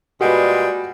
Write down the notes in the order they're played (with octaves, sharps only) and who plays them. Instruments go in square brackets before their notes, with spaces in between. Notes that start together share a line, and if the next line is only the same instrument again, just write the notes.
[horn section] A#2 G3 G#3 [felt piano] F#4 B4